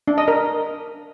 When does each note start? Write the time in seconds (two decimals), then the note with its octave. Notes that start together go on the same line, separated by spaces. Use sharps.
0.08 D4
0.18 D#5
0.28 A#4